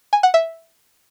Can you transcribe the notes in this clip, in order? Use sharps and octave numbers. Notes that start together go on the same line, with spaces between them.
G#5
F#5
E5